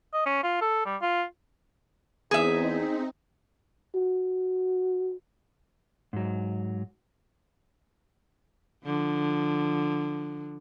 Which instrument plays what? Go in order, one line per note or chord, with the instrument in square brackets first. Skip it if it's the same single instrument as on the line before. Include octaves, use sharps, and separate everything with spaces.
[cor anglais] D#5
C#4
F4
A4
G3
F4
[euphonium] E2 [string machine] C4 D#4 [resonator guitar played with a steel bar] G#4 E5
[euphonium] F#4
[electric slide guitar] G#2 F#3
[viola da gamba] D3 F3